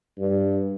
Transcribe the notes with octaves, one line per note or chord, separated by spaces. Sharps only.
G2